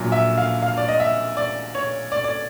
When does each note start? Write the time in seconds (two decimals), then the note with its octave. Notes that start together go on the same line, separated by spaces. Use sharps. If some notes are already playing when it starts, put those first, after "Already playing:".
Already playing: A#1 A#2 F#3
0.12 E5
0.37 F5
0.63 F5
0.77 D5
0.88 D#5
1.00 E5
1.37 D5
1.75 C#5
2.12 D5
2.24 D5